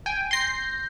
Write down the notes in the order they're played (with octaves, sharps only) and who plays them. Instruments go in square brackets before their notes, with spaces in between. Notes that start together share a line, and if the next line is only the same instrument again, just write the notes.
[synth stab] G5 G#5
[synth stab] C6 C7 [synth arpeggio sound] G6 A#6